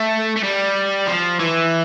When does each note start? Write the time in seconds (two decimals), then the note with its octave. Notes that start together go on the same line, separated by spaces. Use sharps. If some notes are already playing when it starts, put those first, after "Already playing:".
Already playing: A3
0.36 A3
0.43 G3
1.07 F3
1.40 E3